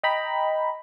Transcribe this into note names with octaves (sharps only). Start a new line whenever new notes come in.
D#5 G5 A#5 B5